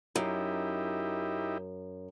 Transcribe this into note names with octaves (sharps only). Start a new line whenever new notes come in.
F#2 D#4 E4 G4